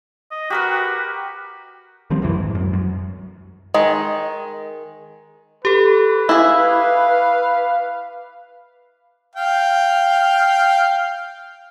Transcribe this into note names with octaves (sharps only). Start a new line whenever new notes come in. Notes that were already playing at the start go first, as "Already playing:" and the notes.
D#5
F#4 G4 A#4 B4
D#3 F3 G3 C4
C2 F#2 E3
G#2
F#2
F#2
D#3 G#3
G4 A4 B4
E4 G#4 F5 D6
F5 G5